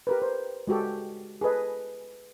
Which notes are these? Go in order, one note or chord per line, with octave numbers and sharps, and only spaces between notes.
G4 A#4 B4
C5
G#3 F#4 G4 A4
G#4 A4 B4 D#5